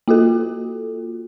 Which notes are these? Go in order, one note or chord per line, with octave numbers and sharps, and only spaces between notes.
A#3 F4 F#4 A4